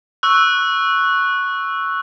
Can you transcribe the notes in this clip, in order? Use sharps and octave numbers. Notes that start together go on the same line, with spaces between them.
C#6 E6 F#6